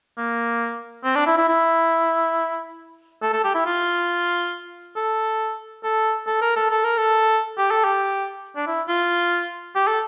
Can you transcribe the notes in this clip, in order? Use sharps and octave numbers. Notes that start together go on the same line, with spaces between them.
A#3
C4
D4
E4
E4
E4
A4
A4
G4
E4
F4
A4
A4
A4
A#4
A4
A4
A#4
A4
G4
A4
G4
D4
E4
F4
G4
A4